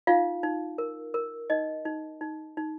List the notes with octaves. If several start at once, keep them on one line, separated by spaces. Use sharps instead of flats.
D#4 F4 F5
D#4
A#4
A#4
D#4 D#5
D#4
D#4
D#4